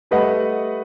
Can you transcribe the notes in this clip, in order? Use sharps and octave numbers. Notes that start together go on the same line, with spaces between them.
G3 A3 B4 D#5 F#5